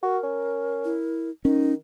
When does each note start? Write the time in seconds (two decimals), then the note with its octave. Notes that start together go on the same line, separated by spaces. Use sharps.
0.03 F#4 A#4
0.24 C#4
0.85 E4
1.45 D#3 C#4 D#4